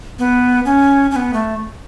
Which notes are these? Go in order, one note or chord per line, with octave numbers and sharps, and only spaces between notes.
B3
C#4
C#4
B3
A3